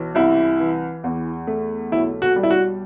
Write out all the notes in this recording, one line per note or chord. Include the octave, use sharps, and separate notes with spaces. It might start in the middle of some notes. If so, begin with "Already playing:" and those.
Already playing: B1 E3
C2 E4
E3
E2
A3
B1 E4
F#4
G3
E4
F#4